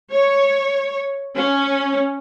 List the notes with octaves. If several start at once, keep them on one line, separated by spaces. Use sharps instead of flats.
C#5
C#4